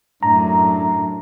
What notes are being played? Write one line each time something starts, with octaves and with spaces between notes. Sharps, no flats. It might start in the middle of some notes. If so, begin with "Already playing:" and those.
F#2 A2 D4 A#5